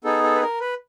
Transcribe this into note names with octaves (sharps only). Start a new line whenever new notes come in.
B3 D#4 G#4 A4
A4
B4
A#4
B4